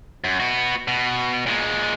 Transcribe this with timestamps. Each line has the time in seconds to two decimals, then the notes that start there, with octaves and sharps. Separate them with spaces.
0.24 F#2
0.40 B3 F#4
0.88 B2
1.46 A#2 G#3